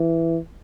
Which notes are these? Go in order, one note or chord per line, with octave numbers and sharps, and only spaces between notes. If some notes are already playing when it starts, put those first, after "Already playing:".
Already playing: E3